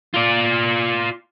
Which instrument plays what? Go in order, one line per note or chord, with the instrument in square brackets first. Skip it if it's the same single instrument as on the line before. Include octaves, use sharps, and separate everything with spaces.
[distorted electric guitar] F4 D5